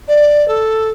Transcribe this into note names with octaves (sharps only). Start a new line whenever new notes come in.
D5
A4